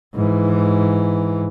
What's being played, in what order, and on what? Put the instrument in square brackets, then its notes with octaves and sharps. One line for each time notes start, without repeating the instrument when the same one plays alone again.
[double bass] G#2 E3